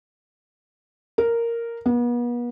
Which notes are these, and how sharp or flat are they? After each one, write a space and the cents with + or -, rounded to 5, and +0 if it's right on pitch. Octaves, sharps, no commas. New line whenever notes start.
A#4 -5
B3 -40